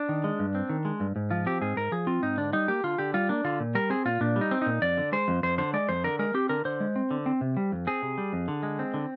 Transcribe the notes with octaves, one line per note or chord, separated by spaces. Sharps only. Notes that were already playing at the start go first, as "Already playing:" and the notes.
Already playing: D4
D#3
G#3
G2
C4
D#3
G#3
G2
G#2
F3 F4
C4 G4
G#2 G#4
G#2 A#4
F3 G#4
C4 F4
G#2 D#4
D3 D4
G3 D#4
A#3 G4
D3 F4
D3 G4
G3 F4
A#3 D4
D3 F4
A#2
G3 A#4
C4 G#4
A#2 F4
A#2 D4
G3
D#4
C4
A#2 D#4
F2 D5
D3
G#3 C5
F2
F2 C5
D3 C5
G#3 D5
F2 C5
D3 A#4
G#3 A#4
C4 G4
D3 A#4
D3 C5
G#3
C4
D3
C4
C3
G3
F2
C4 G#4
C3
G3
F2
D3
G#3
C4
D3